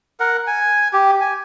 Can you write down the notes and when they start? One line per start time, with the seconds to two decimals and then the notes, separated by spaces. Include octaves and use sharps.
0.20 A#4 F#5
0.47 G#5
0.93 G4
1.21 G#5